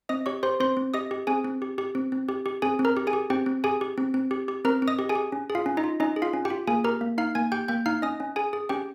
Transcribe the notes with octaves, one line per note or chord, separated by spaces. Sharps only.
C4 D#5 D#6
G4 C#5 C#6
G4 C5 C6
C4 C5 C6
C4
G4 D#5 D#6
G4
C4 G#4 G#5
C4
G4
G4
C4
C4
G4
G4
C4 G#4 G#5
C4
A#4 A#5
G4
G#4 G#5
G4
C4 G4 G5
C4
G4 G#4 G#5
G4
C4
C4
G4
G4
C4 A#4 A#5
C4
D#5 D#6
G4
G#4 G#5
G4
C#4
G#4
F4 F5
C#4
D#4 D#5
F4
C#4 D#4 D#5
G#4
F4 F5
C#4
G4 G5
F4
A#3 G#4 G#5
G4 A#4 A#5
A#3
D#4 F5 F6
A#3 G#5 G#6
G4 G5 G6
A#3 G5 G6
D#4 F5 F6
C#4 D#5 D#6
C#4
G#4 G#5
G#4
C#4 G4 G5